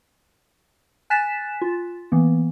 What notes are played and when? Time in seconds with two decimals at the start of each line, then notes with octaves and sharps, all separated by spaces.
1.10 G#5 F#6 A6 B6 E7
1.62 F4
2.12 E3 A#3 B3